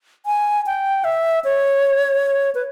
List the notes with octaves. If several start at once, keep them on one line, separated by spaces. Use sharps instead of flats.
G#5
G5
E5
C#5
B4